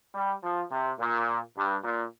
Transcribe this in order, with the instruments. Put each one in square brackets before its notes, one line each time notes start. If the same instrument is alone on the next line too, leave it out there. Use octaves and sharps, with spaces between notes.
[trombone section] G3
F3
C3
A#2
G2
A#2